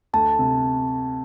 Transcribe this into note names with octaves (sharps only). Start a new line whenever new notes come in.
D2 A5
C3